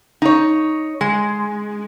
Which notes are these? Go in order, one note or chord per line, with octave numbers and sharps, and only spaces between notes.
D#4 C#5
G#3